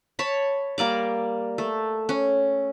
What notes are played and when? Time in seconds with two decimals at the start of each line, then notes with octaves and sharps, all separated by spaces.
0.19 C#5 A5 B5
0.78 G3 A#3 D5 D6
1.58 A3
2.09 C#4